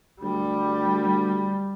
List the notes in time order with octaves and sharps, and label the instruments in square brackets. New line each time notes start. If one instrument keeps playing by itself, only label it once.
[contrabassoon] D2 [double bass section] G3